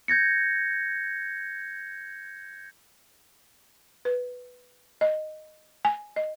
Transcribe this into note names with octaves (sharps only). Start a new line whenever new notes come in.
G6 G#6 A#6 C#7
B4
D#5
G#5
D#5